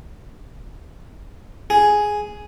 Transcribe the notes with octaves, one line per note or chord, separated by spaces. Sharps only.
G#4